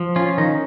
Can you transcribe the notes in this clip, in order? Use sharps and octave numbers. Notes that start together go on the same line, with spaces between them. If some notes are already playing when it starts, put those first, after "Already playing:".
Already playing: F3
C#4 F4
D#3 D#4